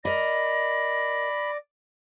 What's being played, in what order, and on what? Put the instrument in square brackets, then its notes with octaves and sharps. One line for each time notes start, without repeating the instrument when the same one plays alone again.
[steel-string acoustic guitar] A#4 D#5 [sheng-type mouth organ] D5 [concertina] B5 [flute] A#6